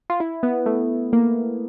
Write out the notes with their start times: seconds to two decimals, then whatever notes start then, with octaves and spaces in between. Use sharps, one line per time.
0.10 F4
0.20 E4
0.43 B3
0.66 A3
1.13 A#3